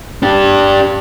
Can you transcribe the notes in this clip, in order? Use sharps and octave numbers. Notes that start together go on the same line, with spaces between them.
D4 G4